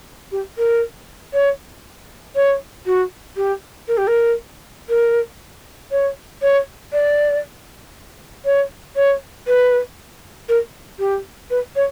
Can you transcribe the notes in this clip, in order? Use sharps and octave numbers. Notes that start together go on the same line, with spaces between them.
G4
A#4
C#5
C#5
F#4
G4
A#4
G4
A#4
A#4
C#5
C#5
D5
C#5
C#5
B4
A#4
G4
B4
C#5